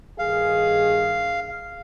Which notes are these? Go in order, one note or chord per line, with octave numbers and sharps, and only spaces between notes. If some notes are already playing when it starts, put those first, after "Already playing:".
G2 D#3 G#4 F5